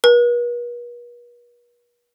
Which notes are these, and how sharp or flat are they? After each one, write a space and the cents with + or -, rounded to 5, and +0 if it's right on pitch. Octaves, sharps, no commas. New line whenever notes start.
B4 -45